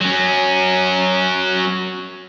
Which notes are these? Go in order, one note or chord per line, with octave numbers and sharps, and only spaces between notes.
F#3 C#4